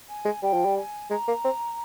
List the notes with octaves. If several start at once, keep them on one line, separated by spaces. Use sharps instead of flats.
G#5
G#3
G3 G5
F3
G3
G#5
G#3 A#5
A#3
C4